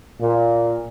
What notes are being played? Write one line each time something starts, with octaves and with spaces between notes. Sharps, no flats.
A#2